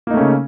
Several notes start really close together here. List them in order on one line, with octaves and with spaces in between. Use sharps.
A#3 D#4 A3 C#4 C#3